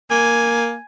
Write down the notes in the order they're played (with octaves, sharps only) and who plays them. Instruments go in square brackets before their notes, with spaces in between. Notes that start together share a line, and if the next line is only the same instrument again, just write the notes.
[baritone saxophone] A#3 [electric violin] G#5